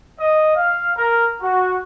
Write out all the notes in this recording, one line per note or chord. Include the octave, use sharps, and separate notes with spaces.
D#5
F5
A#4
F#4